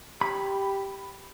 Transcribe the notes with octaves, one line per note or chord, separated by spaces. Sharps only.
G4 B5